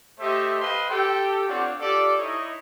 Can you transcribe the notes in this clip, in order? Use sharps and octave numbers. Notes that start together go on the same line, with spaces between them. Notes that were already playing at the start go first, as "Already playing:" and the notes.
A3 G4 C5 D#5 E5
B4 C5 D#5 F5 G5 C6
G4 A4 G5
C4 D4 F4 C#5 D5 F#5
F4 G4 A4 D5
D#4 E4 C#5 D#5